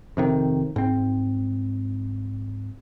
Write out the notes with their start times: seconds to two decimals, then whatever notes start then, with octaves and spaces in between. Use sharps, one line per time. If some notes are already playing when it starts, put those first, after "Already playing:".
0.17 F2 C3 D#3
0.76 G#2 C4